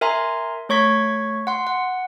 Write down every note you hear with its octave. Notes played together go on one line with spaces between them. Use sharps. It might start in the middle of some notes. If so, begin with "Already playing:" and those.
A#4 E5 G#5 A#5 C6
A3 C#5 C#6 G#6 B6
F#5 C6
F#5